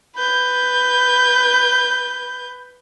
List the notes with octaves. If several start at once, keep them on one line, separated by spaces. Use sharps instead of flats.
B4 G6